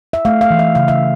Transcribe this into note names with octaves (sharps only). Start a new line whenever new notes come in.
E5
A3 F5
F5
E3
E5
C#3 F5
E5